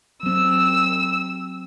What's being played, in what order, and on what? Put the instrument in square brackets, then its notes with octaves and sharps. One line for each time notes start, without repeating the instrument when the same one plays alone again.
[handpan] F#3 C4 [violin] E6